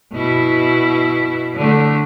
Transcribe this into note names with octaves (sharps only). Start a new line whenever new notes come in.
B2 E4
D3 A3